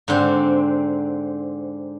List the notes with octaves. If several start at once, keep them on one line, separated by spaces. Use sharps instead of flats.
G#2 D3 C4